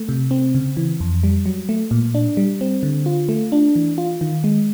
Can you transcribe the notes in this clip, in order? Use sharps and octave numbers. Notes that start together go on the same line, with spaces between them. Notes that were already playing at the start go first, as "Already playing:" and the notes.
Already playing: A3
C3
C4
C#3
E3
F2
G3
F#3
A3
A#2
D4
G3
C4
D3
F4
A3
D4
E3
F4
D#3
G#3